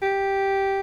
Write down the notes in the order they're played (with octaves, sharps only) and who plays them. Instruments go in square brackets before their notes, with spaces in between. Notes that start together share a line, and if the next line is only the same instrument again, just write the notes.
[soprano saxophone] G4